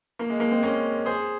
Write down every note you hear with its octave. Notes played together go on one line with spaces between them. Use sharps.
A#3
G#3
A#3
G#3 C4
A#3 C#4
G#4 C5